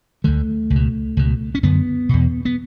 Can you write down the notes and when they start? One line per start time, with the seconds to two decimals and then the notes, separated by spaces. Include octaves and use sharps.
0.24 D2 D3 A3
0.70 C#2
0.75 B2
1.17 C#2 B2
1.55 C#4
1.63 F#2 D3 B3
2.09 E2 B2
2.45 B3